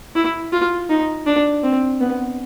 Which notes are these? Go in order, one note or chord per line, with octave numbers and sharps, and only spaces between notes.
E4
F4
D#4
D4
C4
B3